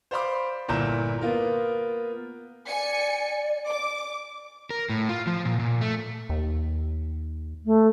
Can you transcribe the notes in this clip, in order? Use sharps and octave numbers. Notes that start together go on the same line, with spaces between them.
C5 D5 F5 B5 C6 D6
G1 A#2 E4 A#5 G6 E7
A#3 B3 F4 A#4
D5 G#5 C#7
D6
A#4
A2
F4
F3
A#2
A#2
A3
D#2
A3